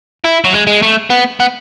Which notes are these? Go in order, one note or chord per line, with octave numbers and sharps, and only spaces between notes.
E4
F#3
G#3
G#3
A3
B3
B3